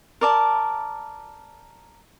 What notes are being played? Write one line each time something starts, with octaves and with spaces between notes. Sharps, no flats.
A#4 D5 A5